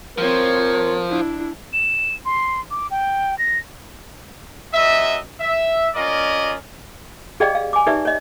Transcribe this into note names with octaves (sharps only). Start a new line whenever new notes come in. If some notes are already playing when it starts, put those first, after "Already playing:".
F3 C4 A#4 C#5
D4 E4
E7
C6
D6
G5
A#6
F#2 D#5 E5
E5
C#4 F4 A#4 D5 D#5
G4 G#4 D5 D#5 F5 G5
F5
G#5 D6
D#4 G4 B4 D5 E5
C#5 D#5